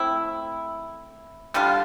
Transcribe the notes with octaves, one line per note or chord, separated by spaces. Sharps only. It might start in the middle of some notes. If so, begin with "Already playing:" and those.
Already playing: A3 C4 E4
D3 G3 D4 F4